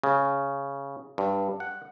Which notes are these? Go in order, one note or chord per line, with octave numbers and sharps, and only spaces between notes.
C#3
G2
F#5